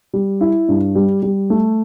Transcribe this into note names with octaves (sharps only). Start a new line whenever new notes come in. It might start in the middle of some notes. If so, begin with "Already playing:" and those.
G3
E4
G2
G3
G3
A3